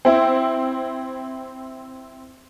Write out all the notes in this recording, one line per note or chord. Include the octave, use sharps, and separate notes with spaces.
C4 E4